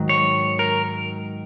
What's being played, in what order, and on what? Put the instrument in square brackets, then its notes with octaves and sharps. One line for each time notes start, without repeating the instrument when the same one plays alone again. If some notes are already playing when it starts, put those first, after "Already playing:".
Already playing: [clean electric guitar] G#2 D#3 F#3
C#5
A#4